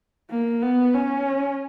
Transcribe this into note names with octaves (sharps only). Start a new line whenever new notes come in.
A#3
B3
C#4